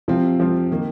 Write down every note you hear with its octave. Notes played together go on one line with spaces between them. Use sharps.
C3 F3 C4 F4
C3 F3 C4 F4
D#3 A#3